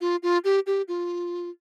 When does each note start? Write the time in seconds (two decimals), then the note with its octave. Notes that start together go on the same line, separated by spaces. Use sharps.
0.01 F4
0.23 F4
0.44 G4
0.67 G4
0.88 F4